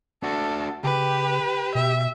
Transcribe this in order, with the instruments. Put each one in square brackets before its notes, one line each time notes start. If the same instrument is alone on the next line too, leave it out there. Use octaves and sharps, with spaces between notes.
[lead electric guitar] D4 F#4 [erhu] A4
[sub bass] C#3 [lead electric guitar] G4 [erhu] B4
[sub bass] B2 [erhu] E5